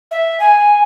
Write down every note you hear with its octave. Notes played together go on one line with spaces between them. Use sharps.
E5
G#5